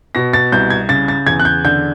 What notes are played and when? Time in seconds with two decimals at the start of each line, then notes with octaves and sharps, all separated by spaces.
0.15 B2 A#6
0.33 A6
0.52 C2 G6
0.70 G#6
0.89 C#3 A6
1.08 A6
1.26 E2 G#6
1.40 F#6
1.45 G6
1.64 D3 G6